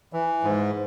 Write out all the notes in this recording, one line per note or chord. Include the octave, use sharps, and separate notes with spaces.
E3
G#2